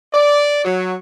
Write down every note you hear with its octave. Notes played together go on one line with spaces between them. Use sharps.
D5
F#3